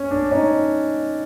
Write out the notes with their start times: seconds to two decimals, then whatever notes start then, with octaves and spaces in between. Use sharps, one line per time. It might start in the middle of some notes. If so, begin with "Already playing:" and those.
Already playing: C#4
0.11 D4
0.31 C#4 D#4